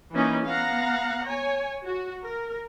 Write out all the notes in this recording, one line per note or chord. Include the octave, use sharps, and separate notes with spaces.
E3 A#3 C#4 D#4
B3 F5 F#5 A#5
C#5 G#5
F#4
A#4